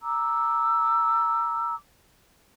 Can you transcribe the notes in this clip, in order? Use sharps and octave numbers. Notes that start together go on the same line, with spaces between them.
A#5 D6 E6